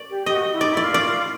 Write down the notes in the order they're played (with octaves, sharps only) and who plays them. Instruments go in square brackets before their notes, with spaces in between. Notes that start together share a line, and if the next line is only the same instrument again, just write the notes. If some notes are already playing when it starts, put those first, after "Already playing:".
Already playing: [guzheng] D5
[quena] G4
[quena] G4 [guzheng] D#5
[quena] F#4
E4
[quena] D#4 [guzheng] D5
[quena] E4 [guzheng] D5
[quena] F4
[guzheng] D5